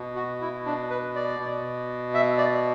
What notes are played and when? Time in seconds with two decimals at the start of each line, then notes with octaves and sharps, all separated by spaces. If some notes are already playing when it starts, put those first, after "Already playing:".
Already playing: B2
0.16 F#4
0.41 E4
0.66 D4
0.90 B4
1.15 D5
1.39 B2
2.14 E5
2.38 D5